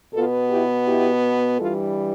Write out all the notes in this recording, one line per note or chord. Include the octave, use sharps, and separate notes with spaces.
B2 B3 F4 A4
E4 G4
E4 G4
G2 E3 G3 F4 A4